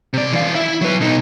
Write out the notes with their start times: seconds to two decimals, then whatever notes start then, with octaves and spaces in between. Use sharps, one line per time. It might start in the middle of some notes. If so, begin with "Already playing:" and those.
0.13 C3 D5
0.33 E3 F5
0.55 E4 E5
0.81 F#3 B4
1.01 B2 D#4